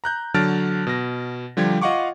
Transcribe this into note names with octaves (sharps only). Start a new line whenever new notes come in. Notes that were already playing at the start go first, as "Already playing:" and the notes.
A#5 F#6 G6
D3 F#3 A5 F6 A6 D7
B2 A#6
D3 F3 G3 G4 G#6
F4 D#5 F5 F#5 C#6 D6